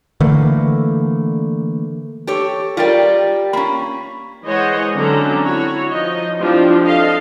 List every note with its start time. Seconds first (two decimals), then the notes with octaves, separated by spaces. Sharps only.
0.20 D3 E3 A3 A#3
2.27 G4 A4 C#5
2.77 F4 G4 A#4 D5 G5
3.53 A#3 C#4 B5
4.45 E3 G#3 C5 C#5 D#5 F#5
4.95 D3 F#3 C4 C#4 A4 A#5
5.42 E4 F#4 C#5
5.90 F3 D#4 D#5
6.40 F3 C4 D4 E4 F4 G4
6.83 A4 D#5 F5